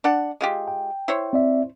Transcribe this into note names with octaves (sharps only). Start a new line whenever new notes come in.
D4 F#5
G#3 F4 G4
G5
E4 C5 C#5
C4 D5 E5